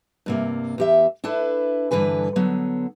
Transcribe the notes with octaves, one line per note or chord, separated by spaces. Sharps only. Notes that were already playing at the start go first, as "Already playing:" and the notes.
G2 C3 A#3
E2 G4 E5
D4 E4 A4 B4
G2 D3 E3 B4 G#5
D3 F#3 B3